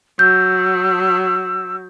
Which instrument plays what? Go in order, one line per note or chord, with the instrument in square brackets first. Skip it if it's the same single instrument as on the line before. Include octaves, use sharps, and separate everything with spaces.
[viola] F#3 [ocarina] E6 [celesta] G6